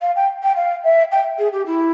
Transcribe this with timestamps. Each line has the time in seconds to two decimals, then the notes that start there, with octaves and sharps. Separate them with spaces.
0.01 F5
0.15 G5
0.42 G5
0.56 F5
0.84 E5
1.11 G5
1.38 G#4
1.52 G4
1.66 E4